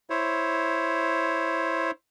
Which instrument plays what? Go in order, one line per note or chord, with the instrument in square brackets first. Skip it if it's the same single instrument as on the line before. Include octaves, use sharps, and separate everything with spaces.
[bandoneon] E4 C5 C#5